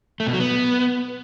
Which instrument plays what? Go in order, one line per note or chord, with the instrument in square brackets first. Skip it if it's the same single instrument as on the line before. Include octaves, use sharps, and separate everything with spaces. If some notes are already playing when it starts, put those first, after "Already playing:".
[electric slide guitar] A3
B2
F#3
B3